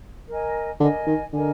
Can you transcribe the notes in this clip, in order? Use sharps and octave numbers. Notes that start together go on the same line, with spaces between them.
A#4 D#5 G#5
D3 A#4 D#5 G#5
D#3
D3 A#4 D#5 G#5